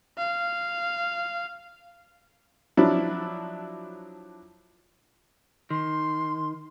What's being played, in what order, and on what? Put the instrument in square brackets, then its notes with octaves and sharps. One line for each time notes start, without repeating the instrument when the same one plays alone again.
[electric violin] F5
[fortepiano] F3 F#3 D4 E4
[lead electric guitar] D#3 [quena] C6